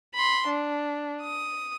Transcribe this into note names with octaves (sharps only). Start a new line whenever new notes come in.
B5 C6
D4
D#6